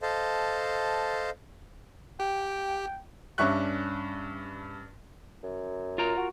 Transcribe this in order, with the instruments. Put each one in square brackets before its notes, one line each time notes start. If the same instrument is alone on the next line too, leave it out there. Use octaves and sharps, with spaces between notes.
[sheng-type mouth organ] A4 C5 D#5 F5 A5
[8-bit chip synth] G4 [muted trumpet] G5
[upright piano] G2 C#4 D4 E5 C#6 F#6
[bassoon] F#2
[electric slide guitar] F4 A#4 A#5
[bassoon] F#4